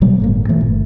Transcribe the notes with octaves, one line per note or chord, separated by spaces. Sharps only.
B2 F#3 G3 A#3
G1 A2 A#3
A#2 E3 A3
G1